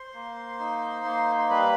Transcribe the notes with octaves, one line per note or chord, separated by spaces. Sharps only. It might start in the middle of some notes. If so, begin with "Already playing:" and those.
Already playing: C5 C6
A#3
D#4
A#3
C6
G3 B4 B5